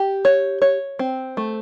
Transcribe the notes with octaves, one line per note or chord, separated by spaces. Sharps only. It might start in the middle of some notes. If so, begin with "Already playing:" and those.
Already playing: G4
C#5
C#5
C4
A3